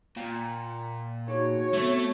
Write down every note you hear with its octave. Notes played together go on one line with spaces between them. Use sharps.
A#2 F5 G5 A#5
D#4 F#4 G#4 C#5
A3 B3 C4 E5